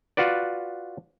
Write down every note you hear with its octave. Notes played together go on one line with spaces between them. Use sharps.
F4 F#4 B4 D5